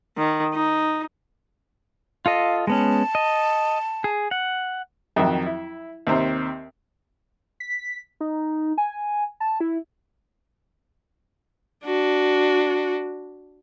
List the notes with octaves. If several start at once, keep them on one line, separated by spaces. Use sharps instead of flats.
D#3
D#4
F4 A4 D#5 F5
G#3 B3 C#4 A5
D#5
G#4
F#5
F2 D#3 F#3 E5
E4
D#2 C3 C4 A#5
B6
D#4
G#5
A5
E4
D4 F#4